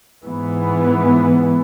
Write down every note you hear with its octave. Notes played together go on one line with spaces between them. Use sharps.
G#2 E3 B3